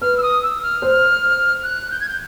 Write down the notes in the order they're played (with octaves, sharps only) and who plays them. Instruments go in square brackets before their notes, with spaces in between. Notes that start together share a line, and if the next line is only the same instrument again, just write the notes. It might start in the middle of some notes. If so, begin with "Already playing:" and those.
[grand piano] B4 [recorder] F6
[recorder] E6
D#6
E6
F6
[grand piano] C5
[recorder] F#6
G6
G#6
G6